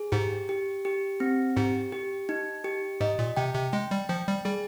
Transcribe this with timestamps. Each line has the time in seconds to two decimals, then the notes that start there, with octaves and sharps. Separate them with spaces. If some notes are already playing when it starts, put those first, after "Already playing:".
Already playing: G#4
0.12 G#2 G4
0.49 G4
0.85 G4
1.20 C4
1.57 G#2 G4
1.92 G4
2.29 D#4
2.64 G4
3.01 G#2 D#5
3.19 A#2
3.37 C3 G5
3.55 C3
3.73 G#3 G5
3.91 G3
4.09 F3 G5
4.27 G3
4.45 G3 G#4